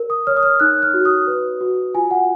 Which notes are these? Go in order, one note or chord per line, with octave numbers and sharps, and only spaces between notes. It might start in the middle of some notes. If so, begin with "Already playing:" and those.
Already playing: A#4
D#6
C#5 F6
D#6
F6
D#4 F#6
F6
F#4
D#6
B4
F#4
F4 G#5
F#5